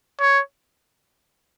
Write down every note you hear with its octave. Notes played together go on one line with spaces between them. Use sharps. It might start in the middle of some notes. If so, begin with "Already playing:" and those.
C#5